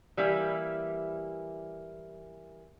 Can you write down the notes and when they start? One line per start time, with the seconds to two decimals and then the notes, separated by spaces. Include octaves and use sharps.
0.17 E3 G3 A#3 E4